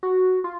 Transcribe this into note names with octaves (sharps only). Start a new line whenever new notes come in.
F#4
F4